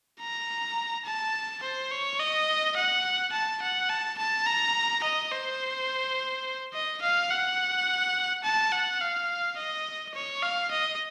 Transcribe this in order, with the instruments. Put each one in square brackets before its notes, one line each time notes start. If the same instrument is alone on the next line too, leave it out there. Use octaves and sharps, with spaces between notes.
[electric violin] A#5
A5
C5
C#5
D#5
F#5
A5
F#5
A5
A5
A#5
D#5
C5
D#5
F5
F#5
A5
F#5
F5
D#5
C#5
F5
D#5